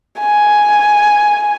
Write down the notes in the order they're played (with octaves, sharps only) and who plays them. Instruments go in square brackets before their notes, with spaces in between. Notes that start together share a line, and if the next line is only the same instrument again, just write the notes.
[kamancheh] G#5